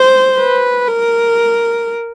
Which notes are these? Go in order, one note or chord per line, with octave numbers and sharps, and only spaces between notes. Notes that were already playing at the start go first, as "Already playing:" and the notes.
Already playing: C5
B4
A#4